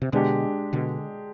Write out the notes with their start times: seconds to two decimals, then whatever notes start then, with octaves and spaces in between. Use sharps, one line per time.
0.02 C3
0.12 B2 D3 G#3 D4 G4
0.73 B2 D3